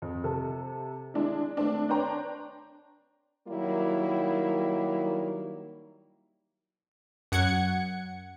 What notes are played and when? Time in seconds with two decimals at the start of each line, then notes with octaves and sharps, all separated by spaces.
0.02 F2
0.24 C3 A4
1.14 G#3 D4 E4
1.57 A3 C4 D4
1.89 D4 B4 C#5 G5 A#5 C6
3.48 D#3 F#3 G3 A#3 E4
7.32 F#2 F#5 G#6 C#7